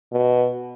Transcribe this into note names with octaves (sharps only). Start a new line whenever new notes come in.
B2